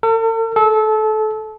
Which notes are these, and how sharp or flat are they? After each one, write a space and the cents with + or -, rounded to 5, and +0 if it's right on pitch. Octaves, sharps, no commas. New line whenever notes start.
A4 +45
A4 -25